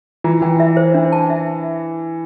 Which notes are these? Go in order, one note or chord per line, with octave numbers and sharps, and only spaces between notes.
E3 F4
E3 G5
E5
C5
D4
A5
E5